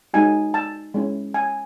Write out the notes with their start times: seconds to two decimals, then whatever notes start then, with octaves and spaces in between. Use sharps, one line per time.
0.14 G#3 D#4 F#4 G#5
0.54 A5
0.94 G#3 C#4 E4
1.34 G#5